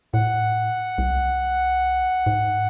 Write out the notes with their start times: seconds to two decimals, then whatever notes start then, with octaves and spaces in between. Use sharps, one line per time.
0.14 A2 F#5
0.98 C2
2.26 G#2